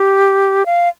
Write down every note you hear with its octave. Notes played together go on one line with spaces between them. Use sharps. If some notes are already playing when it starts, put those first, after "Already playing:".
Already playing: G4
F5